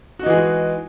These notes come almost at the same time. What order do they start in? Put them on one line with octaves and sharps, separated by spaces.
F#4 D#4 E3 G#4 G#3